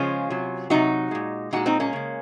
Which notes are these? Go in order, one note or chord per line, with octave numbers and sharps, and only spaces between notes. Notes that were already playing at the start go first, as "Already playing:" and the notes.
Already playing: C#3 F3 G#3 C#4 F4
C3 F#3
C3 F#3 D#4 F#4
A#2 G#3
A#2 G#3 D#4 F#4
C4 D#4
A#3 C#4
C#3 G#3